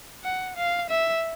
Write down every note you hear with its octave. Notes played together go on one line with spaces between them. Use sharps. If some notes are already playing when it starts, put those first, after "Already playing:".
F#5
F5
E5